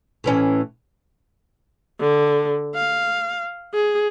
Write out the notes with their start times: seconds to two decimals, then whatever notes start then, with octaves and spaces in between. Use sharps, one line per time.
0.24 A2 E3 C#4
2.01 D3
2.75 F5
3.74 G#4